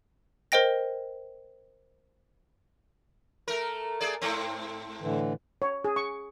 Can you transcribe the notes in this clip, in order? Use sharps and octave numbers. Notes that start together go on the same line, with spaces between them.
A#4 C5 D#5 G5 A#6
A3 A#4
A3 G#4 D5
G#2 A3 C4
A2 D3 E3
C#5
G#4
C#6